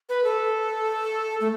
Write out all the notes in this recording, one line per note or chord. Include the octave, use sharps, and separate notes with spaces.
B4
A4
A3